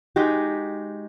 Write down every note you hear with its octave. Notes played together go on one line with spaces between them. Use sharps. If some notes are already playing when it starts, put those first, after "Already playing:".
G#3 D#4 F#4 G4